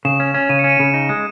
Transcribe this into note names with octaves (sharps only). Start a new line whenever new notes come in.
C#3 E7
C#4
C#4
C#3 D#7
C#7
C#4
D#7
C#3
D#4
G#3